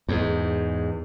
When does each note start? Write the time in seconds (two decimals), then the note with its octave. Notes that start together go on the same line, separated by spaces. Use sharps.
0.09 E2 G#2